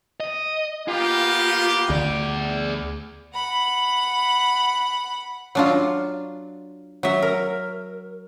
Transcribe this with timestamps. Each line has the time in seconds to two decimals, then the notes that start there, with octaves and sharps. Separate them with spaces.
0.20 D#5
0.88 A#3 B3 F4 G4
1.90 D2 G#4 D5
3.34 F#5 B5
5.55 F#3 D4 F4
7.03 F#3 E5
7.22 A#4